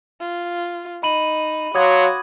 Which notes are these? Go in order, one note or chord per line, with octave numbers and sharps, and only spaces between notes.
F4
D#4 B5 D#7 F#7
F#3 F#4 C#5 F5 C6 D6 D#6 G#6